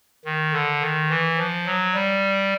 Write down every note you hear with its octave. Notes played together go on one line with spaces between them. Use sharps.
D#3
D3
D#3
E3
F3
F#3
G3